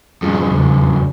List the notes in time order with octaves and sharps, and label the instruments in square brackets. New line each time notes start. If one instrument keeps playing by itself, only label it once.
[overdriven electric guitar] F2 G#2 [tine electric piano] G3 F4 G#4
[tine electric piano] E2 C#3